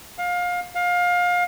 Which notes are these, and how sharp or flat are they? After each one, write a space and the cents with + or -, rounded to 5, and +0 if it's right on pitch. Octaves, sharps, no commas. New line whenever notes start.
F5 +25
F5 +25